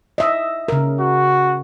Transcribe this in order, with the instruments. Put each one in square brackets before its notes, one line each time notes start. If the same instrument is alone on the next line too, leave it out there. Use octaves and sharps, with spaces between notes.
[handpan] D#5 E5
C#3 A#4
[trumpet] F#4